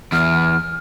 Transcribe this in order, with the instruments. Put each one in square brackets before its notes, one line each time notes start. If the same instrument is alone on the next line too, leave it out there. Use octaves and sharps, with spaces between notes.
[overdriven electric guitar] E2 [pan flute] F6